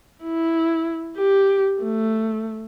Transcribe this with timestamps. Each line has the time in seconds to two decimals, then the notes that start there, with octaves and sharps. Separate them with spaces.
0.24 E4
1.17 G4
1.82 A3